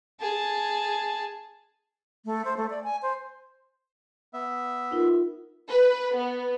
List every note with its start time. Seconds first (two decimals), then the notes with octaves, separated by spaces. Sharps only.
0.21 G#4 A5
2.25 A3
2.45 C5
2.57 A3
2.70 D5
2.84 G#5
3.02 C5
4.33 B3 E5
4.91 D#4 F4 A#4
5.70 B4
6.16 B3